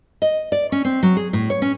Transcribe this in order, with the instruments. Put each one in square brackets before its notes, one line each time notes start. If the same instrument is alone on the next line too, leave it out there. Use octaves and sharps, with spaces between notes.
[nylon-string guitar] D#5
D5
C#4
C4
F#3
G#4
A2
C#5
C#4